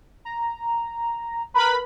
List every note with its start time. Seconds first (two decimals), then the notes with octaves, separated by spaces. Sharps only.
0.25 A#5
1.54 A#4 B4 B5